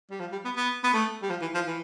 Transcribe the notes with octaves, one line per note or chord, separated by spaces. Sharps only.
G3
F3
G3
B3
B3
B3
A3
G3
F3
E3
F3
E3